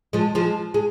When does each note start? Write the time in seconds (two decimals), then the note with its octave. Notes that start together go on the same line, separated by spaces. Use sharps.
0.13 F3 G#3
0.35 F3 G#3
0.74 G#3